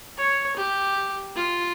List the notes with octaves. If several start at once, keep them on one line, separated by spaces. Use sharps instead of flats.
C#5
G4
F4